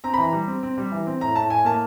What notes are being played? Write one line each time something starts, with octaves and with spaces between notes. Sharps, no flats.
C4 A#5
B5
E3 A#5
G3
C4
C4
G3
E3
C4
A2 A#5
A2 A5
A2 G#5
A#3 A5